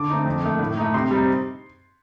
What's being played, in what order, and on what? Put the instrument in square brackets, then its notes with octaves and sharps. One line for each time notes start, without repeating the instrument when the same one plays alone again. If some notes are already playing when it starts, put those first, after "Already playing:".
Already playing: [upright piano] D3 D6
A3 C4 D#4
F2
D#3 A3
A2
A3 D#4
C3 C6
G3 C4 D#4